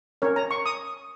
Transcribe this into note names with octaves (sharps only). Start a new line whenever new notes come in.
C#4 A#4 C#5
A#5
C#6
D#6